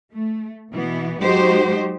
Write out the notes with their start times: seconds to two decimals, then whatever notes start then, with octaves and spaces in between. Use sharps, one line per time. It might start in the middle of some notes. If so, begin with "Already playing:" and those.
0.13 A3
0.72 B2 E3 B3
1.21 F#3 G#3 D#4 F#4 G4 C5